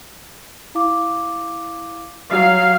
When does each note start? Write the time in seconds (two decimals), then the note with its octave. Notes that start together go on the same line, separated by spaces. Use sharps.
0.75 E4 F5 D6
2.31 F#3 F5 C7